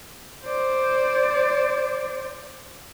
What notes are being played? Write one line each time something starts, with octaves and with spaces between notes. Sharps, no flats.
C5 D5